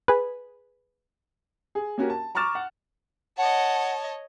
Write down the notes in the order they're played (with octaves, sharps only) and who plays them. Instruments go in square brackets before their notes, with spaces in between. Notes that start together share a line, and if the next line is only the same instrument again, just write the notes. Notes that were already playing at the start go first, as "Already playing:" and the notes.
[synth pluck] G#4 B4
[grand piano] G#4
A#3 C#4 F#4 G4 A#4
A5
A#5 C#6 D6 F6 A6 E7
F#5
[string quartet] C#5 D#5 [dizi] F#5 [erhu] A5